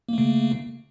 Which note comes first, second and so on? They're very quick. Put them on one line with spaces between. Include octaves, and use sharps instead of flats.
A#3 A3 C#3